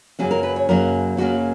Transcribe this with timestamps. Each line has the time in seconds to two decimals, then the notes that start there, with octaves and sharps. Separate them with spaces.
0.19 F#2 C#3 F#3 A#3 G#4
0.31 A#4
0.43 B4
0.56 C#5
0.69 F#2 C#3 F#3 A#3 A#4
1.17 F#2 C#3 F#3 A#3 F#4